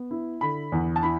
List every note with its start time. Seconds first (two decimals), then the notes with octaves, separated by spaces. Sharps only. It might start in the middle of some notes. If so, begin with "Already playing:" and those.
Already playing: B3
0.11 E4
0.41 D3 B5
0.72 E2
0.96 A5
1.03 E4 B5